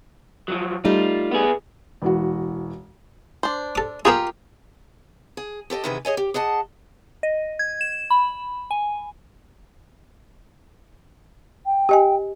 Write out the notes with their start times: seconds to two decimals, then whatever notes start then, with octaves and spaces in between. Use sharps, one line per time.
0.48 F3 F#3
0.85 G3 A3 D#4 F4
1.31 B3 G#4
2.02 E1 E3 F#4
3.43 D4 C5
3.75 A4 D6
4.05 A#3 B3 F4 G4 G#4 A#4
5.37 G#4
5.70 G4 A4 B4 D#5
5.84 C3 D#3 E3 B3 G#4 B4
6.05 G#4 C#5 D#5 G#5
6.17 G4
6.34 G#4 D#5 F#5 A5
7.23 D#5
7.59 G#6
7.81 E7
8.10 B5
8.71 G#5
11.66 G5
11.89 G4 D#5 G#5